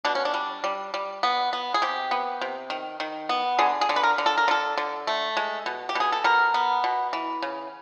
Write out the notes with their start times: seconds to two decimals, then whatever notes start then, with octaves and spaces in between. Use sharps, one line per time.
0.05 B2 D4
0.15 C#4
0.25 D4
0.34 G3
0.64 G3
0.94 G3
1.23 B3
1.53 B3
1.74 G#4
1.82 C3 G4
2.11 B3
2.41 C3
2.70 D#3
3.00 D#3
3.29 B3
3.58 D3 G#4
3.81 G#4
3.89 D3
3.96 B4
4.03 A#4
4.18 D3
4.26 A4
4.38 A#4
4.48 D3 A4
4.77 D3
5.07 A3
5.37 G#3
5.66 B2
5.89 G4
5.95 B2 G#4
6.12 A4
6.24 B2 A#4
6.54 B3
6.84 B2
7.13 E3
7.42 C#3